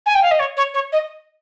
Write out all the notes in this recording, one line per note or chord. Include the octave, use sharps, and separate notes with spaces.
G#5
G5
F5
D#5
C#5
C#5
C#5
D#5